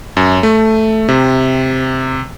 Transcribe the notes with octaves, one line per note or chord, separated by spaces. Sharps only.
F#2
A3
C3